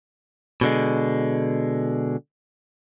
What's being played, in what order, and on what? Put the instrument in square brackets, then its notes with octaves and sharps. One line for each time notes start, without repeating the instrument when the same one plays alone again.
[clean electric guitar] B2 D3 G#3